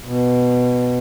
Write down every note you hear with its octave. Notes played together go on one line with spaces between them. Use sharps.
B2